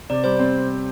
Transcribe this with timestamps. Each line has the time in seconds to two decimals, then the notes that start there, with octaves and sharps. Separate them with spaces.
0.10 C3 D5
0.24 G3 C5
0.39 C4